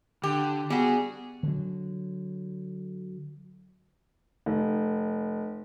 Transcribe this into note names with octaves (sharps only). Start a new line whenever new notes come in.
D3 G4
G3 B3 F#4 G#4
D3 F#3
F1